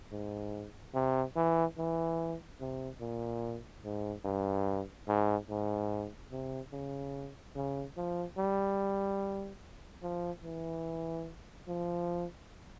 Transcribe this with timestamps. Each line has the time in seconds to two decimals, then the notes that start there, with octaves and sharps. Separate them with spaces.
0.12 G#2
0.95 C3
1.36 E3
1.78 E3
2.61 C3
3.01 A#2
3.84 G#2
4.25 G2
5.08 G#2
5.50 G#2
6.32 C3
6.73 C#3
7.56 C#3
7.97 F3
8.38 G3
10.03 F3
10.44 E3
11.68 F3